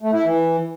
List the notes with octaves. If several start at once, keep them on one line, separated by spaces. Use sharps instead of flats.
A3
E4
E3